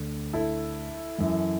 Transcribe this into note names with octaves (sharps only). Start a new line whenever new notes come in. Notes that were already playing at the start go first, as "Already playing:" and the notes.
Already playing: D2 D3
E4 A4
F#2 E3